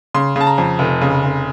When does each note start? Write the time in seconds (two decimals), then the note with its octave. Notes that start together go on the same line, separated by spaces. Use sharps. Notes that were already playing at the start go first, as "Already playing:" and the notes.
0.14 C#3 C6
0.36 C#3 A5
0.47 A#5
0.58 F2
0.79 F1
1.01 C#3
1.23 F1